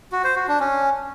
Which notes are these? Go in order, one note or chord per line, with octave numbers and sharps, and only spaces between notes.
F#4
C5
F#4
D4
C#4